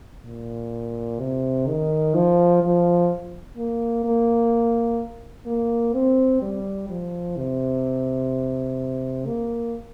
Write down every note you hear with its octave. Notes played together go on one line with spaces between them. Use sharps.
A#2
C3
D#3
F3
F3
A#3
A#3
A#3
C4
G3
F3
C3
A#3